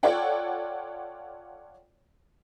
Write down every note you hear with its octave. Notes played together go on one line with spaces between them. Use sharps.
F4 A4 C#5 D5 F#5 G5